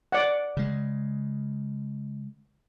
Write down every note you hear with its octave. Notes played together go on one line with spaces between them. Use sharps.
D5 F#5
C#3 G#3